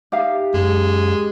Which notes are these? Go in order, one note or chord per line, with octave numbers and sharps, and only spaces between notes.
D#4 G4 E5 F5
F#2 G#3